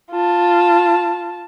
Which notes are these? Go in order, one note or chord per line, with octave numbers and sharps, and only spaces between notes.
F4 A5